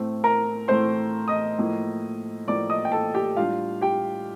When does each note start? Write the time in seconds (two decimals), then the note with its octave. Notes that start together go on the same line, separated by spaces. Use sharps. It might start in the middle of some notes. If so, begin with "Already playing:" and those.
Already playing: A2 A3 C4
0.24 A#4 A#5
0.68 A2 A3 C4 C5 C6
1.28 D#5 D#6
1.58 A2 F3 A#3
2.47 A2 F3 A#3 D5 D6
2.70 D#5 D#6
2.85 G5
2.92 A4 A5
3.14 G4 G5
3.37 A2 G3 D4 F4 F5
3.81 G4 G5